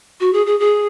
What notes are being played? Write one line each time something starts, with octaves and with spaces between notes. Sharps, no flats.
F#4
G#4
G#4
G#4